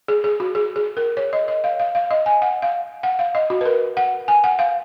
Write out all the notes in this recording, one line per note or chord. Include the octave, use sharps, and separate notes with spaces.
G#4
G#4
F#4
G#4
G#4
A#4
C#5
D#5
D#5
F5
F5
F5
D#5
G#5
F#5
F5
F#5
F5
D#5
F#4
B4
A#4
F#5
G#5
F#5
F5